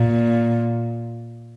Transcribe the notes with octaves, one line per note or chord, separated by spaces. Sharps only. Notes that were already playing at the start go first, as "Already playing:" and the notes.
Already playing: A#2